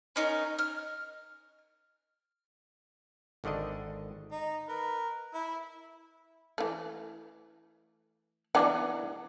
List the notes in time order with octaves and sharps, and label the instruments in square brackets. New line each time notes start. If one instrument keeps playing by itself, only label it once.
[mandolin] C#4 D#4 A#4
F6
[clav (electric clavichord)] G#1 D3 D#3 D4 D#5
[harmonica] D#4
A#4 B4
E4
[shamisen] E3 A3
[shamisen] E3 B3 D#4 [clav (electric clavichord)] D4 F#5